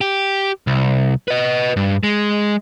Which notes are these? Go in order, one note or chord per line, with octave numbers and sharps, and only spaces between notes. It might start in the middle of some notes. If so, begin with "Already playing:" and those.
G4
C2
B4 D#5
G2
G#3